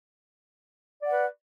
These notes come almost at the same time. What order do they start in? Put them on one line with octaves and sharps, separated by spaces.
D5 F#5 B4